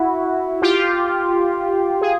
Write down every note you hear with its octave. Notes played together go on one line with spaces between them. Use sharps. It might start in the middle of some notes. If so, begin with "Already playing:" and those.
Already playing: E4 F#4
F4 G4
G#4